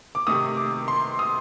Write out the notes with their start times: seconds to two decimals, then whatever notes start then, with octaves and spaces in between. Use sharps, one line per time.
0.15 D6
0.27 C3 D#3 A3 D#6
0.57 D6
0.88 C6
1.19 D#6